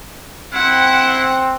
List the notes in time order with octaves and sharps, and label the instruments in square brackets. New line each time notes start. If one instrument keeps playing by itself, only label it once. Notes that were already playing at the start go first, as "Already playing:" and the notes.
[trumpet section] C4 [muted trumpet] E4 [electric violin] F#5